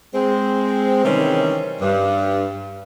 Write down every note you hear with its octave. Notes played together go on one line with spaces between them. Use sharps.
G#3 C4
C3 D#3 E3 G3 C#4
G2